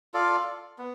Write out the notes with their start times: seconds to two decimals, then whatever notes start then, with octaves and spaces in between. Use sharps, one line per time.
0.14 F4 A4 D5 F5
0.78 B3